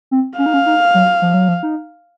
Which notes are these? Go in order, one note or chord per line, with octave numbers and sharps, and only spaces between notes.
C4
C#4 F5
D#4
C#4
D#4
F#3
F3
F#3
F3
D#4